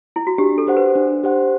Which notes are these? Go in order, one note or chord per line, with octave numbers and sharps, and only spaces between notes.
E4
F#4
D4 G4
A4
G4 C5 F#5
B4
D4
G4 C5 F#5